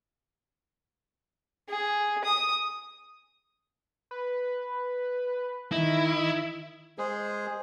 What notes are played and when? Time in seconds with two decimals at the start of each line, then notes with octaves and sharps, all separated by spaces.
1.69 G#4
2.25 D#6
4.11 B4
5.72 D#3 E4 D#5
6.98 G#3 G#4 C5